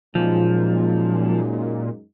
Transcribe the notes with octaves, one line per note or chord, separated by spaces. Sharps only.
F#2 A#2 F3 G#3 D#4